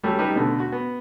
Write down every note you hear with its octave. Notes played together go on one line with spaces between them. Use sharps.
F#3 G3 A3 C#4
G3 D#4 B4
B2 D3 A3
F#4
B3